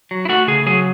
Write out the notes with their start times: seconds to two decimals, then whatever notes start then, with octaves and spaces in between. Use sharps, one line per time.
0.11 F#3
0.25 E4
0.29 A3 F#4
0.47 C#3 G#4
0.66 F#3 G#4